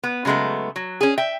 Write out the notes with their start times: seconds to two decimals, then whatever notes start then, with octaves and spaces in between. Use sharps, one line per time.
0.03 B3
0.25 C#3 F#3 G#3 A3 B3
0.76 F#3
1.01 C#4 G#4
1.18 E5 G5